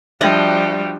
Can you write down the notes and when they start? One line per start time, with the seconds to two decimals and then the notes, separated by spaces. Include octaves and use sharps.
0.21 F3 G3 D4 F#4 D#5 E5 G5